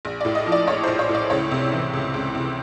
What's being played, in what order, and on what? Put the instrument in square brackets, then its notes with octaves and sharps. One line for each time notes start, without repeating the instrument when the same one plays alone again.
[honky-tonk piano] A#1
A2 D5
D#5
F3
D5
A#1 C#5
A#1 C5
C#5
A2
D5
C#2 C#5
C3
E3
C#2
C#2
C3